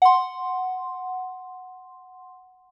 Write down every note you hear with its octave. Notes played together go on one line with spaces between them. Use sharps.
F#5 C6